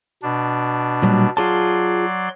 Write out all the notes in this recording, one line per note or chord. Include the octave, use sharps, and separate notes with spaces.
B2 D4
A#2 F#3 G3
F#3 F4 G#4 D5 A5 C6